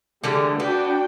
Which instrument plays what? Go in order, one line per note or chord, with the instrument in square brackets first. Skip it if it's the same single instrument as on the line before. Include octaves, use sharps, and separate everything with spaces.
[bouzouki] D3 E3 G3 [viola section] G#3 D4 A4
[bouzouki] B3 [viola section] D4 F#4 G5